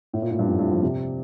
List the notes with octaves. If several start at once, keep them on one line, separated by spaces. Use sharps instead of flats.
A2
A#2
A2
G2
F2
A2
G2
F3
C3